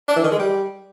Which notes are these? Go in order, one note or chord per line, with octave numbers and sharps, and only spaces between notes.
D4
E3
D#3
G#3
G3